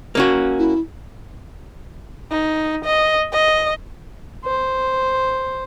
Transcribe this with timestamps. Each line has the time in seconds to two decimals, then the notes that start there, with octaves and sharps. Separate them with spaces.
0.15 A#3 C#4 F#4
0.58 E4
2.31 D#4
2.85 D#5
3.32 D#5
4.45 C5